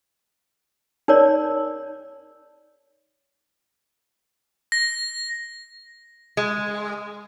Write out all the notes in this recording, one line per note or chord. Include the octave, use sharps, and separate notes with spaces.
D#4 A#4 C#5 D5
A#6
G#3